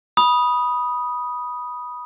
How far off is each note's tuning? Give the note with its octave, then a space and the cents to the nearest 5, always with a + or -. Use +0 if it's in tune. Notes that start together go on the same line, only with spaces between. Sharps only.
B5 -15 D#6 +0